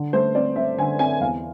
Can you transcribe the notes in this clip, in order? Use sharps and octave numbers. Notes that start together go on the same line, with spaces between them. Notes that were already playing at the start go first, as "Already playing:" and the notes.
Already playing: D3
A3 C5
C4 D5
C4 E5
D3 G#5
C4 G#5
E2 F5